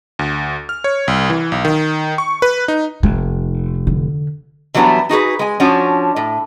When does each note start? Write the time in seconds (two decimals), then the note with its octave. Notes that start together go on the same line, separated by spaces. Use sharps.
0.19 D2
0.69 F6
0.84 C#5
1.08 C2
1.30 E3
1.52 B1
1.65 D#3
2.18 C#6
2.42 B4
2.68 D#4
3.03 F1 A#3
3.87 D3
4.74 E3 F#3 G3 B3 D4 E4
5.09 D#4 F#4 G#4 B4
5.39 G#3 G#5
5.60 F3 C#4 D4 F#4
6.16 A2